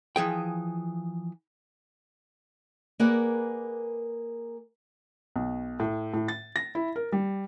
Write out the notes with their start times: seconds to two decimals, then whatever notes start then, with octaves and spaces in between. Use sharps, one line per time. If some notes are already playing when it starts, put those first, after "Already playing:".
0.16 E3 F3 G#4 G5
2.99 A#3 G#4 A#4 B4 D5 F#5
5.36 B1
5.80 A2
6.14 A2
6.28 A6
6.56 A#6
6.75 E4
6.96 A#4
7.12 G3